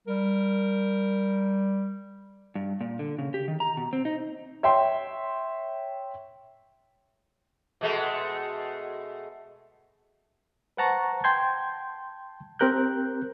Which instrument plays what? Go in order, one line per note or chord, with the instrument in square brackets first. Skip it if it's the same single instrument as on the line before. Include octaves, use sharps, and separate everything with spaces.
[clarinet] G3 [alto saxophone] A#4
[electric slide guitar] G2
A#2
D3
C#3
G4
D#3
A#5
B2
C4
D#4
[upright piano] C#5 E5 G5 C6
[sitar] B2 G#3 A3
[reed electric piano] B4 C5 F#5 A5 A#5 C#6
G5 A5 C6 G6 G#6
C4 G4 A#4 F#6 G6